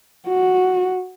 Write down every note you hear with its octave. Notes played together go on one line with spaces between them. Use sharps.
F#4